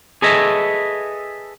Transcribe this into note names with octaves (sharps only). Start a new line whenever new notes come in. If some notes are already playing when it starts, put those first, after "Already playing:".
G#4 A4 B4 C#5 D#5 E5